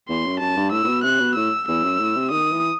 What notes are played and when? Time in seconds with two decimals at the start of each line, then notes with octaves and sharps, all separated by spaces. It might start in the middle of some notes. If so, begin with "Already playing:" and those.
0.09 E2 C6
0.25 F#2
0.40 F#2 A5
0.57 G2
0.72 A2 E6
0.84 A2
0.88 B2
1.03 C3 F#6
1.20 B2
1.35 A2 E6
1.68 E2 E6
1.83 F#2
1.99 A2
2.15 C3
2.31 D#3 D#6
2.52 E3